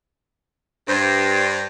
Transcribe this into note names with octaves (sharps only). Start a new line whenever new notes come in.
G2 C5